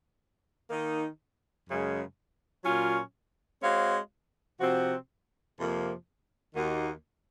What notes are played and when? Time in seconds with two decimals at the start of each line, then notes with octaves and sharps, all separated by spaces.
0.70 D#3 A#3 D#4
1.67 F#2 C#3 G#3
2.64 A#2 F#3 C#4 F4
3.62 G#3 C4 F#4 C#5 F5
4.60 C3 F3 C4 F#4
5.58 F2 C3 F3 A#3
6.55 D#2 D#3 A#3 D#4 F#4